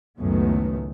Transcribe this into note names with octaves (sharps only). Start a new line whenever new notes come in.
C#2 F#2 A2 D#3 A3 B3